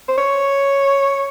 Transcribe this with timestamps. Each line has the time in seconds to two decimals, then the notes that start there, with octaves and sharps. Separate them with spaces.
0.08 C5
0.18 C#5